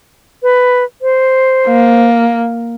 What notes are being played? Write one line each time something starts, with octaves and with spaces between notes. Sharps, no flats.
B4
C5
A#3